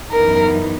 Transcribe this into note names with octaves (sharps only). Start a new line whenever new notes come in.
F#2 E3 B3 D#4 A#4